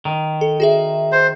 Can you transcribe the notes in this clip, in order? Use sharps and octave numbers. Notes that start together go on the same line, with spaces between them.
D#3
A4
F#4 G#4 E5
C5